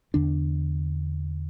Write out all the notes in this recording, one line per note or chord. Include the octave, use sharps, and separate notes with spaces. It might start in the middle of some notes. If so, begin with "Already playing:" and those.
E2 D3 D4